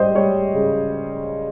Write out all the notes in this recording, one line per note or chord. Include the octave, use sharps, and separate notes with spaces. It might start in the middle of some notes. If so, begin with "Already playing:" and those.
Already playing: G3 C5 D#5
G3 C#5
C#3